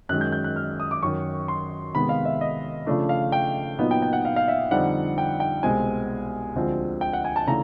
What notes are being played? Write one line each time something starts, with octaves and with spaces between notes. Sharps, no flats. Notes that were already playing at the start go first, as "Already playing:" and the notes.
F#2 D#3 G#3 F#6
G6
G6
F#6
F6
D#6
D6
F#2 D#3 F#3 C#6
C6
C3 D#3 G#3 B3 B5
F5
E5
D#5
C#3 F3 A3 D4
F5
G5
A#2 F#3 B3 D#4
G5
G5
F#5
F5
F5
E5
F2 D3 G3 C4 D#4 F#5
G5
G5
C2 B2 G#3 C4 G#5
D2 D3 F3 G#3 C4
G5
F#5
G#5
A5
C#3 E3 A3 D4 A#5